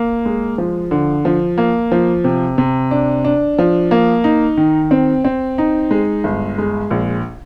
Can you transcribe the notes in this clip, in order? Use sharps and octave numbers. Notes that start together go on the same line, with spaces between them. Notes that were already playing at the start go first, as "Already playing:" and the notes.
Already playing: A#3
G#3
F3
D3
F3
A#3
F3
C3
C3
D4
D4
F3
A#3
D#4
D#3
C4
C4
D#4
G#3
G1
G#3
A#1